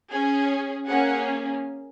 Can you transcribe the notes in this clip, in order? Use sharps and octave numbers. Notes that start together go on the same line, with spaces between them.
C#4 G#4
A#3 C#4 G#4 F#5